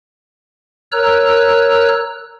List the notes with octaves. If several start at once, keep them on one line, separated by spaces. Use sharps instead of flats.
A#4 C#5 A#5 E6 F#6